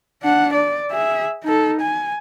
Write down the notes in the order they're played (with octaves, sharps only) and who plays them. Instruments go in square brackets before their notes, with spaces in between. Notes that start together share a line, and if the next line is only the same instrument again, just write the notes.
[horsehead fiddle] D4 F#5
D5
G#4 E5
D#4 A4
G#5